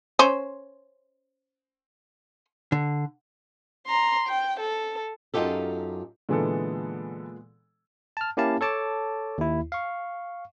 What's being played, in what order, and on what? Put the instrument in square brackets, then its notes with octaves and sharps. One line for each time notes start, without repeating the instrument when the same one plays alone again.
[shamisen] C#4 C5
[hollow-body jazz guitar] D3
[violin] A#5 C6
G5
A4
[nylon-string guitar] F#2 D#4 F4 G4 A4
[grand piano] A#2 G#3 B3 [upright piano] D3 E3 A4
[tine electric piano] A5 F6
A#3 C#4 E4 G4 F5 A5
A4 C#5 A5 D6
D#2 E4
F5 C#6